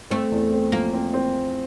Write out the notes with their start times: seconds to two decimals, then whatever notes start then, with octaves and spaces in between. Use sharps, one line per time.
0.10 A3 C4
0.32 E2
0.52 C4
0.72 F3 A#3
0.93 C4
1.13 C4